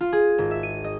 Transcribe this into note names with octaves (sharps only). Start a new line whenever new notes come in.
F4
G#4
G#1
E5
D#7
D#5